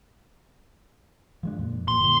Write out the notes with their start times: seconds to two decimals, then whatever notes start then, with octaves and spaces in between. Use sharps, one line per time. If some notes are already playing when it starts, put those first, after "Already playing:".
1.43 F3 G#3 D4
1.59 F2 A#2
1.88 A#2 F3 C6
2.00 G1 F#2 A#2